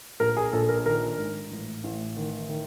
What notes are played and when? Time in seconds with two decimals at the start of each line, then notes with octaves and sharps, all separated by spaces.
0.20 A#1 A#4
0.37 G#4
0.53 A#1 A4
0.69 A#4
0.86 D#3 A#4
1.18 G#2
1.51 A1
1.84 A1
2.16 D#3
2.49 D#3